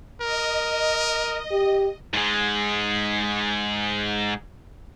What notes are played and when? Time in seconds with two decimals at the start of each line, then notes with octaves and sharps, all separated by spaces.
0.21 A#4 D#5
1.51 G4
2.14 G#2 G#3